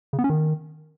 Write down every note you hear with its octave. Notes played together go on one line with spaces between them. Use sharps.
C#3
B3
C#4
D#3